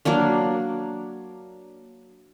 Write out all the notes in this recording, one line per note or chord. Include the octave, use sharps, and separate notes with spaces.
F#3 A#3 D4 F5